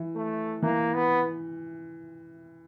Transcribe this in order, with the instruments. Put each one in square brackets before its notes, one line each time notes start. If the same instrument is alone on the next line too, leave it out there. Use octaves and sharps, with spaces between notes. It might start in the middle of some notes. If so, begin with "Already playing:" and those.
Already playing: [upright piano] E3
[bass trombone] A3
[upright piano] E3 [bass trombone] A#3
[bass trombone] B3